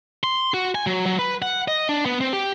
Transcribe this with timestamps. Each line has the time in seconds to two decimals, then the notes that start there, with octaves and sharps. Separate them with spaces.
0.24 C6
0.54 F#4
0.75 G#5
0.87 F#3
1.06 F#3
1.19 B4
1.42 F#5
1.68 D#5
1.89 D4
2.06 B3
2.21 C4
2.33 G4